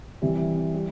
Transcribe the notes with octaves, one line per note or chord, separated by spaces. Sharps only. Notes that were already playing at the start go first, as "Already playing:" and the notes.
C3 E3 G3
G3